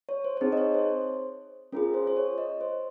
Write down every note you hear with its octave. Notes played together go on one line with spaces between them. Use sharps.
C#5
C5
C#5
C4 D#4 G#4 C5
D#5
C#5
C5
C5
C#4 F4 G#4 A#4
C5
C5
C#5
D#5
C5